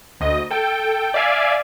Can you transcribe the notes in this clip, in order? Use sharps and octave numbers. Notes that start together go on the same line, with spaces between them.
D2 D#5
A4 G5
D5 E5 F5 G#5